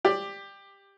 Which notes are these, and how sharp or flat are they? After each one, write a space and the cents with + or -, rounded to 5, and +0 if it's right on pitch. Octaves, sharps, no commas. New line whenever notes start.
G4 +15 D5 +10